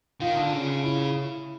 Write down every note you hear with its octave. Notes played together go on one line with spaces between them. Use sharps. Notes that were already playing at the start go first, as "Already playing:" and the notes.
D#3 F4
D3
C#3
E4